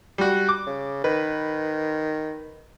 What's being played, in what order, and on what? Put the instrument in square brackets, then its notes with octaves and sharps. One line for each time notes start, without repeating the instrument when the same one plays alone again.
[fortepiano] G3 F#4
D6
[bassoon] C#3
[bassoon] D#3 [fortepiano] B4